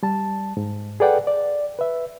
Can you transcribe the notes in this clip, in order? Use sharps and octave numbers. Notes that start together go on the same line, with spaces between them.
G3 A5
G#2
G#4 A4 B4 D5 F#5 G5
D5
B4 E5